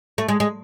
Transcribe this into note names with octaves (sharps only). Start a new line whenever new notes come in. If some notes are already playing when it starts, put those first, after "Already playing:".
A3
G#3
G#3